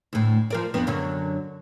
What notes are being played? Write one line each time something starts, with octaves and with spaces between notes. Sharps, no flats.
D2 A2
F3 A#4 D5
F2 B3 D4
F#2 D3 F#3